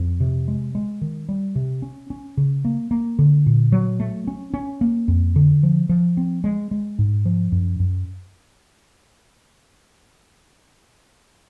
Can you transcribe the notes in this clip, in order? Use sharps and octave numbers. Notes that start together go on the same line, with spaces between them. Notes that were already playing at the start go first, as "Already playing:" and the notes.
Already playing: F2
C3
G#3
G#3
D#3
G3
C3
C#4
C#4
C#3
A#3
A#3
D3
A#2
F#3
A3
C#4
C#4
A#3
F2
D3
F3
F3
C4
G#3
G#3
G#2
F3
F#2
F#2